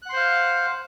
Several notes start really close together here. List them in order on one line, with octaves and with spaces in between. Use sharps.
F#6 F#5 C6 C5 F5